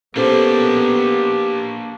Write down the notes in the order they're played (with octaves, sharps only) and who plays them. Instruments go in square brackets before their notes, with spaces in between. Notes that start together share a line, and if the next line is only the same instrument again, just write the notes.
[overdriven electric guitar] A#3 D4 [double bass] B3 [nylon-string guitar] C#4 A4 C5 [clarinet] G4